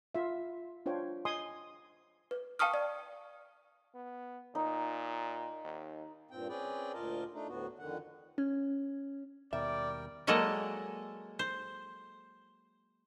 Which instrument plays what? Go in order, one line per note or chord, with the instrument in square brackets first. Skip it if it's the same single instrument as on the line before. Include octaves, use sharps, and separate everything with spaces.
[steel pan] F4 E5
D4 F4 C5 C#5 G5
D#5 G#5 C6 D#6
[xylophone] B4
F5 G5 A5 C#6 D#6 F6
D5
[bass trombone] B3
[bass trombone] A#2 [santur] D#4
[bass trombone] D#2
[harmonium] G2 A#2 C4 G5
C4 C#4 G#4 B4 D5 G5
D2 A#2 F4 A#4 D#5 A5
A3 D4 D#4
D2 A2 B3 F#4
F2 D3 D#3 F#5
[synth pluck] C#4
[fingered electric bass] D#2 B2 [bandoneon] G3 A#4 G5 [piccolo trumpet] D5 [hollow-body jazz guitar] E5
[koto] F#3 G#3 A#3 A4 D5 D#5
C5